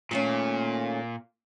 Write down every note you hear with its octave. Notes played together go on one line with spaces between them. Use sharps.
A#2 D#3 A3 C#4